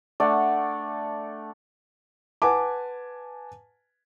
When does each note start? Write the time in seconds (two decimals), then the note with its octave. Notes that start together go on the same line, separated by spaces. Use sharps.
0.20 A3 D4 D5 F#5
2.42 B4 F#5 G#5 A5 D6